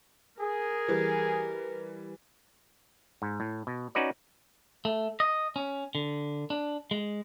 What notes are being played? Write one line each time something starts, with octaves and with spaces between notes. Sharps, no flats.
G#4 A#4
E3 G3
G#2
A2
B2
C#4 D#4 F#4 B4 D5
A3
D#5
C#4
D3
D4
G#3